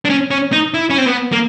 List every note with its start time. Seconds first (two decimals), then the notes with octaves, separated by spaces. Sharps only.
0.05 D4
0.10 C#4
0.31 C#4
0.52 D#4
0.74 E4
0.90 C#4
0.98 C4
1.06 B3
1.32 A#3